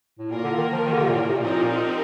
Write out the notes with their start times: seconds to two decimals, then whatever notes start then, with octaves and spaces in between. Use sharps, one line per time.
0.19 A2
0.31 A#2 A#3 F4 A#4
0.44 D3
0.58 D#3
0.72 F3
0.86 D#3
0.93 D3
1.00 C3
1.09 A#2
1.15 A2
1.29 C3
1.37 A#2
1.42 A2 F3 C4 D#4 G4 A#4
1.54 A#2